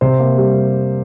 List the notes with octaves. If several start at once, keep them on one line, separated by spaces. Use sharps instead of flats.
C3 C5
A#3
G3